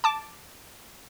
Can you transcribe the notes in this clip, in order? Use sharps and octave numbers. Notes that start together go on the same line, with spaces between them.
A5 D6